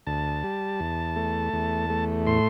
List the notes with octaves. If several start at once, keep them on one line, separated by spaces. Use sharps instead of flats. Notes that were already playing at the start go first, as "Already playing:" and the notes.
D2 A5
G3
E2
A3
E2
A3
A2 C6